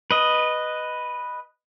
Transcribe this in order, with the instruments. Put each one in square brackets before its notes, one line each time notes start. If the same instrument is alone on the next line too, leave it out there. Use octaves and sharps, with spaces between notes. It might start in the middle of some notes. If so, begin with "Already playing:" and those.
[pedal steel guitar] B4 D#5